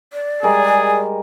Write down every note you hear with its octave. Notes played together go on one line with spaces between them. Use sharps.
D5
G3 G#3 G#4 A#4